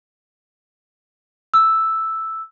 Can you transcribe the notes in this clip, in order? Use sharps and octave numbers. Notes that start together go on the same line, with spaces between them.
E6